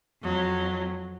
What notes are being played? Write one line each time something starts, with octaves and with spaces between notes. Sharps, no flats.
F2 F#3